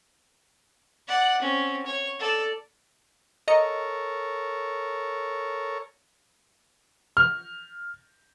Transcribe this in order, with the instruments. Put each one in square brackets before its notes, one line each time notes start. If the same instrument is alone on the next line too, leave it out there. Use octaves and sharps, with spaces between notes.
[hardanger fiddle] D5 F#5
C4 C#4
C#5
A4 D5
[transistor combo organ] A4 A#4 C#5 [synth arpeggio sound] D#5 A#5 C#7
[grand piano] F6